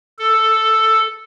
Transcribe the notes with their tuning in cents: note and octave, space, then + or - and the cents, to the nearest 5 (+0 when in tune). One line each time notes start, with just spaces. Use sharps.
A4 +5